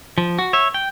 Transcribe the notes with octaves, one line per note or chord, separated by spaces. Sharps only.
F3
F#4
C#5 E5
G5